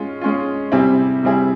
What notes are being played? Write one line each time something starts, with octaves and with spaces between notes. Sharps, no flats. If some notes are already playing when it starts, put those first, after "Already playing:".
Already playing: G#3 C#4 F4
G#3 C#4 F4
C3 G3 C4 E4 G#4
C3 G3 C4 E4 G#4